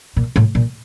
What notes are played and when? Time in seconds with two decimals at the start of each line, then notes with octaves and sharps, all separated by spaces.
0.17 A#2
0.36 A2
0.55 A#2